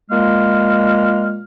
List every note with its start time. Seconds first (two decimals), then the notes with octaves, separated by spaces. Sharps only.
0.11 A#2 G#3 A#3 F6